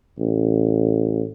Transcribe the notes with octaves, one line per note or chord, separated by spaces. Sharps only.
A1